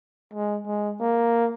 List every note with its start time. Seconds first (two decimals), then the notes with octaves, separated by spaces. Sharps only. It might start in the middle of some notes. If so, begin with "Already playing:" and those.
0.33 G#3
0.67 G#3
1.00 A#3